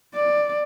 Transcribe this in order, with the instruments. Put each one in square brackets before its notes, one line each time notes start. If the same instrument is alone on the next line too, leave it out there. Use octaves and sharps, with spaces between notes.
[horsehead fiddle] D5